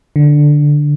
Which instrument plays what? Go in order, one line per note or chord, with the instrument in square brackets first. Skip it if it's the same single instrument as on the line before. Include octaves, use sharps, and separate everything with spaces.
[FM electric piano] D3